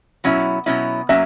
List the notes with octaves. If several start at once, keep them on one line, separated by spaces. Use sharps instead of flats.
B2 F#3 C#4 E4
B2 F#3 C#4 E4
F#3 A#3 C#4 E5